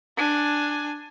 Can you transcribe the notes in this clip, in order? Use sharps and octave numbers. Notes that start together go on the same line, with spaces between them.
D4 G#5